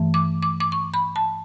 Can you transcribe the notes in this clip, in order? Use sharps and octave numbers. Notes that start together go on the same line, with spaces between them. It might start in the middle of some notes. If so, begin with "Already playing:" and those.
Already playing: G2 E3 A3
D6
D6
D6
C#6
B5
A5